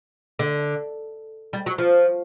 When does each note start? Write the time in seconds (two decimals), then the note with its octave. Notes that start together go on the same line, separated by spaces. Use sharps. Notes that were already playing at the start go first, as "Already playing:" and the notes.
0.39 D3
1.53 G3
1.66 F#3
1.78 F3